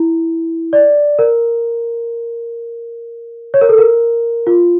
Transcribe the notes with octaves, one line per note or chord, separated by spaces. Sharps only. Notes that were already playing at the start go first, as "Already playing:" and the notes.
Already playing: E4
D5
A#4
C#5
A#4
A4
A#4
F4